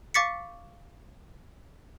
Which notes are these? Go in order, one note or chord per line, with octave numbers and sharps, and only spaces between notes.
F5 C#6 D6 A6 B6 C#7